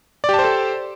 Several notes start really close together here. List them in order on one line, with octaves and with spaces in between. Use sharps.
D5 G4 A5 C5 A4